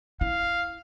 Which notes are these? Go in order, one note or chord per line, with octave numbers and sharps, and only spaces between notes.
E4 F5